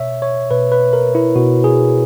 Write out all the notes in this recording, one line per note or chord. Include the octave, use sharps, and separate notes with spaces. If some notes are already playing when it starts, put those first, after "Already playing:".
Already playing: B2 C#5 E5
C#5
B2 B4
B4
A#4
E4
B2 F#4
G#4